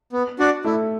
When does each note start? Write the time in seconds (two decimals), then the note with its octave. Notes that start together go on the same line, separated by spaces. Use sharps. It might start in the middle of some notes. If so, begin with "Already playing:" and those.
0.13 B3
0.39 D4 F#4 D5
0.64 A3 E4